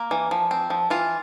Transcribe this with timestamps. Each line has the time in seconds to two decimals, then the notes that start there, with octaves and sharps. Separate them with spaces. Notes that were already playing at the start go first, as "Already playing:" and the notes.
Already playing: A#3
0.11 E3
0.31 F3
0.51 C4
0.70 F3
0.90 E3 F4